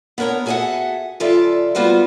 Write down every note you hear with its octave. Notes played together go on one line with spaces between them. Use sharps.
B3 D4 A#4 C#5 A#5
F#4 G#4 A4 D5 E5 F#5
C#3 F3 F4 A4 D5 E5
G3 B3 F4 F#4 C5